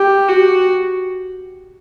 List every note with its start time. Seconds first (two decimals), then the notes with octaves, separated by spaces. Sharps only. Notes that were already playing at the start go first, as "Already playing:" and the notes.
Already playing: G4
0.28 F#4